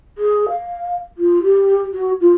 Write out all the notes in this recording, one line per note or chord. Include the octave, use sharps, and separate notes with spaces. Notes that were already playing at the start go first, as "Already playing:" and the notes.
G#4
F5
F4
G4
F#4
F4